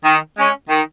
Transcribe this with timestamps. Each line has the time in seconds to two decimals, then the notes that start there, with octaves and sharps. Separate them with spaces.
0.04 D#3
0.37 G#3 C#4
0.69 D#3